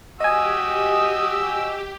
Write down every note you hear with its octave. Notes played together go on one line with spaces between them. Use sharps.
F#4 G4 D#5 G#5 D#6 E6